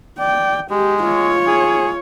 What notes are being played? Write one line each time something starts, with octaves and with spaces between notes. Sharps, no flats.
D5 G5
G#3 G4
F4 C#5
G#4